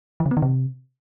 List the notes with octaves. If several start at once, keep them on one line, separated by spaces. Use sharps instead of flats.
E3
C#3
B3
D#3
C3